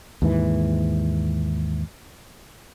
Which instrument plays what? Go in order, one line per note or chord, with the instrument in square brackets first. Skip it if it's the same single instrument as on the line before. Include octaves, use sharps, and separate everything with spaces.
[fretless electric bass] D#2 G#2 E3